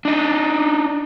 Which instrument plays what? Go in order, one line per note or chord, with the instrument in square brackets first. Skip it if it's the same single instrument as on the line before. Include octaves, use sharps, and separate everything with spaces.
[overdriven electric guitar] D4 D#4